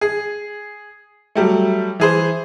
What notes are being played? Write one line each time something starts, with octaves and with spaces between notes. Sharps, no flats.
G#4
F#3 G3 A3
E3 G#4 C5